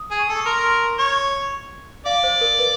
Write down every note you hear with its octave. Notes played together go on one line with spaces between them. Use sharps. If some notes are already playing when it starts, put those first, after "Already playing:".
Already playing: D#6
G#4
C#6
A4
A#4 C6
C6
C#5
D5 F5
C5
A#4
B4